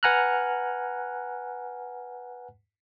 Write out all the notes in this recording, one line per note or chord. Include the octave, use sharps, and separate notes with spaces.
B4 F#5 G#5 A#5 F6 F#6